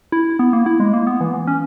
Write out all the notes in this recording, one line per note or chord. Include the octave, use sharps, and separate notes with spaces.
E4
B3
A#3
E4
G#3
A#3
B3
E3
E3
C#4